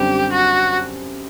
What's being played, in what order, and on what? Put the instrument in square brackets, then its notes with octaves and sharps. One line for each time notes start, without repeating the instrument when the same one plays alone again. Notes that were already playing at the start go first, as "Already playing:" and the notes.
Already playing: [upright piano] F#2 D3 G3 C4 [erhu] G4
[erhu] F#4